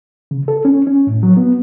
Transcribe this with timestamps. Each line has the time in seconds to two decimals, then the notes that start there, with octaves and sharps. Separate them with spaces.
0.31 C#3
0.48 A4
0.65 C#4
0.87 C#4
1.07 A2
1.23 F#3
1.37 B3